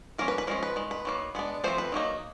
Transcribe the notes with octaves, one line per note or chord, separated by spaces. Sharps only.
F3 A#3 C#4 A#4
B4
B4
F3 G#3 C#4 A#4
B4
D#3 G#3
B4
D#3 F#3 A#3
G#3 B3 D4
F3 A3 C4 C5
B4
D#3 F#3 A#3 D#4